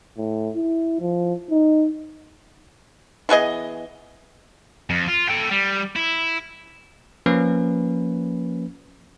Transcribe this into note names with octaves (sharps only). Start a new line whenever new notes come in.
A2
E4
F3
D#4
E3 B3 G#4 D#5
F2
F4
A4 G5
G3
E4
F3 A#3 C#4 B4